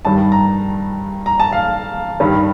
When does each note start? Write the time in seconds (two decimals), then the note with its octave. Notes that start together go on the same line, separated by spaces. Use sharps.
0.05 G2 D#3 G3 A5
0.32 A#5
1.26 A#5
1.40 A5
1.52 F5
2.20 G2 D#3 G3